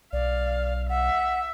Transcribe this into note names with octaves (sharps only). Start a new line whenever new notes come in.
B1 D5 F5
E5 F#5